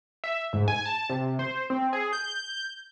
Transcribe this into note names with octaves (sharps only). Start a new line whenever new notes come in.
E5
G#2
G#5
A5
C3
C5
C4
G#4
G6